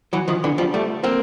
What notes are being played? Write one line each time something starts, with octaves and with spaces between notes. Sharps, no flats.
E3 F#3
D#3 F3
D3 E3
F3 G3
G3 A3
A#3 C4